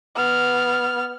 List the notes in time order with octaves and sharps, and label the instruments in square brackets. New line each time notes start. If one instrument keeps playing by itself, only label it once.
[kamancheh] B3 F6